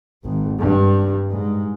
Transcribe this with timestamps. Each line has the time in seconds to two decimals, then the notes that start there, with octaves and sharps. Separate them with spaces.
0.23 G#1
0.59 G2
1.29 G#2